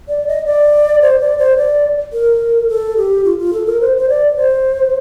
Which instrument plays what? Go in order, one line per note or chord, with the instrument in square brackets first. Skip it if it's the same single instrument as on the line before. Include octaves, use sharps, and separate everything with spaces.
[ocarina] D5
D#5
D5
C5
D5
C5
D5
A#4
A4
G4
F4
F4
A4
A#4
C5
C5
D5
C5